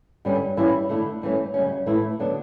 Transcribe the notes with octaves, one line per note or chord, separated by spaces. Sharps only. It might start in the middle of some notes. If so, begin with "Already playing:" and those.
G2 D3 G3 C#4
G2 E3 G3 C#4 E4
D3 A3 E4
G2 E3 A3 C#4
F#2 C#3 G3 C#4
A2 E3 A3 E4
D3 F#3 B3 D4